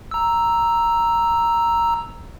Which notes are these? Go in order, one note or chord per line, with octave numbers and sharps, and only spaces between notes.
A#5 E6